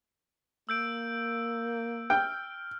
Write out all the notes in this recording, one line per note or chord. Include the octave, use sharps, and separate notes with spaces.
A#3 E6 G6 D7
G5 F6